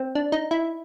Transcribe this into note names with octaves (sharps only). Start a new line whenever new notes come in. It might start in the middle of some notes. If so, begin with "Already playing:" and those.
Already playing: C4
D4
D#4
E4